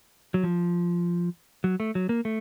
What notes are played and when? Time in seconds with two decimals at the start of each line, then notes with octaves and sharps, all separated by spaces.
0.34 F#3
0.44 F3
1.64 F#3
1.80 A3
1.95 F#3
2.09 A#3
2.25 A3